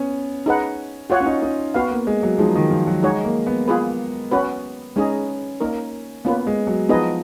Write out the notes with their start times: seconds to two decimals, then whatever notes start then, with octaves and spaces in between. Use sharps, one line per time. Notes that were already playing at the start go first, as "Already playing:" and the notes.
Already playing: B3 C#4
0.46 D#4 G#4 B4 F#5
1.10 F4 F#4 C#5 F#5
1.20 C#4
1.26 D#4
1.42 D#4
1.74 B3 F#4 B4 F5
1.90 A#3
2.07 G#3
2.23 F#3
2.38 F3 G#3 D#4 G#4
2.55 D#3
2.70 F3
2.87 F#3
3.02 G#3 D#4 G#4 C#5 F#5
3.24 A#3
3.47 B3
3.68 F4 G#4 B4
4.31 C#4 F#4 B4
4.96 G#3 C#4 D#4 G#4 D#5
5.60 A#3 D#4 A#4
6.25 A#3 B3 C#4 F4 B4
6.47 G#3
6.67 F#3
6.89 F3 B3 D#4 G#4 B4 D#5